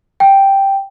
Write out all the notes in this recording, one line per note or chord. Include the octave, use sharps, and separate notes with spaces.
G5